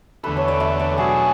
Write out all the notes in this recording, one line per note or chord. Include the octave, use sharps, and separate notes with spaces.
E2 D3 A3 B4
C#5
D5
E5
D5
B2 F#3 A3 D4 F#4 G#4